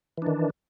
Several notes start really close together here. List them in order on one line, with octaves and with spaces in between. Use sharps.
E3 D4 D#3